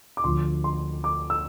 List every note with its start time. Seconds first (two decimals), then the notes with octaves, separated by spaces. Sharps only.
0.17 D6
0.24 D2 D3 F3 C6
0.64 C6
1.04 D6
1.30 E6